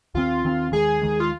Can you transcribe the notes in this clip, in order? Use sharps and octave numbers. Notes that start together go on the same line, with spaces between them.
D#2 D#3 C4 F4
D#2 D#3 C4
D#2 D#3 G#3 G#4
D#2 D#3 G#3
F4